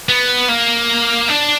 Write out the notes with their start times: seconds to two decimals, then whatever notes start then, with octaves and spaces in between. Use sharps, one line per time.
0.09 B3
0.49 A#3
1.29 D4